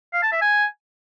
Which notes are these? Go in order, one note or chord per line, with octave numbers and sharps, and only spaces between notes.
F5
A5
E5
G#5